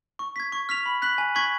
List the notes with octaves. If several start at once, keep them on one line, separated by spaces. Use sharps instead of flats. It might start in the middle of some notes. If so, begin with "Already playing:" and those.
C#6
G#6 B6
C#6
F6 B6 F7
B5
F#6 B6 F#7
G#5
C#6 G#6 B6 F#7